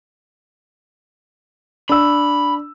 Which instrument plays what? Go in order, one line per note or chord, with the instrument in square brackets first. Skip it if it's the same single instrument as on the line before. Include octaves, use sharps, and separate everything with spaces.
[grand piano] D4 E6 [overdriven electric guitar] B5